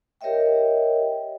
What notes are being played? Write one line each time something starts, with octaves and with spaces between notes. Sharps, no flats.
G4 A#4 C#5 D#5 E5 G5